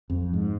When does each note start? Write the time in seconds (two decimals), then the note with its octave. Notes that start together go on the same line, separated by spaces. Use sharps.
0.10 F2
0.33 G#2